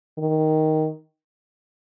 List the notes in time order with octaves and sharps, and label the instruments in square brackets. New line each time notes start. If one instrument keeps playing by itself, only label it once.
[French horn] D#3